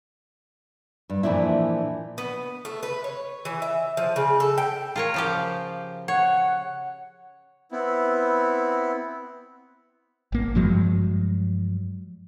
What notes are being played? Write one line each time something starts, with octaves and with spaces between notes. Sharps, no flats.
G2
A#2 E3 F3 D4 E4
B3
A3
B4
C#5
E3
E5
F3
C#3
A4
G5
F4 A#4 C#5
C#3 F3 G4
C#5 F#5
B3 C4 E4
G#1 A#3
G2 F3 F#3 G#3